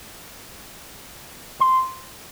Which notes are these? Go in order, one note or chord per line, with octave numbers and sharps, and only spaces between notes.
C6